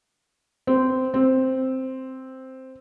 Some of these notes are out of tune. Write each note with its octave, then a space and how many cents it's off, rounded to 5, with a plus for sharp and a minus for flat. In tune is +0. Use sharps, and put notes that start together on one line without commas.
C4 -15
C4 +0